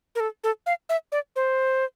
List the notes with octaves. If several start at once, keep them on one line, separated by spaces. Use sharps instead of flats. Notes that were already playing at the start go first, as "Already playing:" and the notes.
A#4
A4
A4
F5
E5
D5
C5